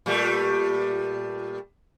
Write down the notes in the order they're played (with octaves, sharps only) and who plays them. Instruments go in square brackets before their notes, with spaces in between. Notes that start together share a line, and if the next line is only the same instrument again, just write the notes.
[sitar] A#2 G3 A3